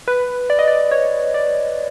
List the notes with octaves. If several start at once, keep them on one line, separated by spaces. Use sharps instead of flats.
B4
D5
D#5
D5
C#5
D5